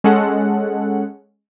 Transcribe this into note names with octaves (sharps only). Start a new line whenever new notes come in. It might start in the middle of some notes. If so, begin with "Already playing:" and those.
G#3 C#4 A4 F#5